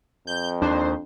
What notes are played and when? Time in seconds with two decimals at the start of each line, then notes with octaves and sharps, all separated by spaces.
0.27 F2 G6
0.62 D#2 D4 C5